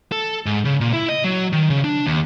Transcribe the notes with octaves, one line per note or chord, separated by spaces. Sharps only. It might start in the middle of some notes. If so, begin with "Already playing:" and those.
A4
G#2
C#3
A#2
E4
D#5
F#3
D#3
C#3
D4
D#2